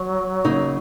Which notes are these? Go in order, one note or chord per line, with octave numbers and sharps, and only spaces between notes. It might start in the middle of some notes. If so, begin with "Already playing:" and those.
Already playing: F#3
C#3 A#3 D#4